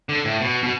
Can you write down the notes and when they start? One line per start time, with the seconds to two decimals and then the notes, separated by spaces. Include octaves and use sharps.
0.09 D3
0.25 A2
0.41 B2
0.63 B2